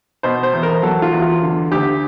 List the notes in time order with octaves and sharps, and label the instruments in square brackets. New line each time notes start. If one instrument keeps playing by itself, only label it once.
[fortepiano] B2 C5
C5
E2
A#4
F#3 A4
F4
E2
F4
D3
D2 G4